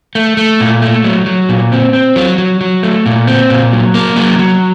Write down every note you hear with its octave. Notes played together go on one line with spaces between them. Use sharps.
A3
A3
A#2
A3
F#3
F#3
A#2
C4
C4
F#3
F#3
F#3
A3
A#2
C4
A#2
F#3
A#3
F#3
F#3